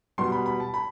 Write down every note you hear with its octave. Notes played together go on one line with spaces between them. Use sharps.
B2 G3 B3 C6
B5
B5
A5
B5